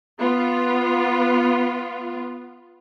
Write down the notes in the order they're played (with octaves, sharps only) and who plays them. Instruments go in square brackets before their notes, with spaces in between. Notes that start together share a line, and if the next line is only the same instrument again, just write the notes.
[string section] B3 F4